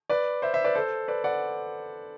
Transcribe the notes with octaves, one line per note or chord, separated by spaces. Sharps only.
B4 D5
C5 E5
C5 E5
B4 D5
A4 C5
B4 D5
D5 F#5